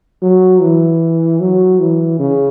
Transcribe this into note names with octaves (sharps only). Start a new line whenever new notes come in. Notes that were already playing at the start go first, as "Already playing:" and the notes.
F#3
E3
F#3
E3
C#3